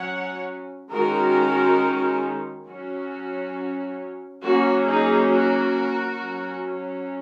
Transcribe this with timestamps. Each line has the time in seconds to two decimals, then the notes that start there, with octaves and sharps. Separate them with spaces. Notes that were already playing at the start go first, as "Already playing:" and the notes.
Already playing: F#3 C#4 C#5 F#5
0.91 D#3 G#3 C#4 F#4 A#4
2.66 F#3 C#4 F#4
4.42 F#3 A#3 C#4 F#4
4.86 D#4 G#4
5.30 F#4 A#4
6.18 F#3 C#4